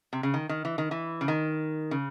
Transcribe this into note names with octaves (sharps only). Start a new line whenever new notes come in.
C3
C#3
D#3
D#3
E3
D#3
E3
C#3
D#3
C#3